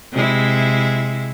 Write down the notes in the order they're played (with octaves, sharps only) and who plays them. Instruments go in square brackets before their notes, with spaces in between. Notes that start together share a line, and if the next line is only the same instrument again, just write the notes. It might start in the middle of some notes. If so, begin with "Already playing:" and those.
[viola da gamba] C3 G#3 E4